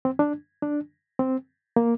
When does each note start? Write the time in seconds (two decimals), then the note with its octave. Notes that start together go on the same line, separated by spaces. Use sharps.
0.05 C4
0.19 D4
0.62 D4
1.19 C4
1.76 A#3